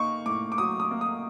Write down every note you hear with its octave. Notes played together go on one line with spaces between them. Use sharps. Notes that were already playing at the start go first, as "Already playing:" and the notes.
Already playing: A#3 D#4 C#6
A2 D6
D6
F#3 D#6
D#6
A#3
D#6